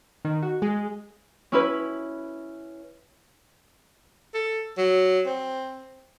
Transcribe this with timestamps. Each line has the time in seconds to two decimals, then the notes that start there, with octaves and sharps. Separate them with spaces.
0.25 D#3
0.43 F#4
0.62 G#3
1.52 C#4 E4 B4
4.34 A4
4.77 F#3
5.26 C4